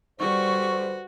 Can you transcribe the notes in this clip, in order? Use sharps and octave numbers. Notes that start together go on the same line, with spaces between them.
D3 G3 F#4 B4 C5 C#6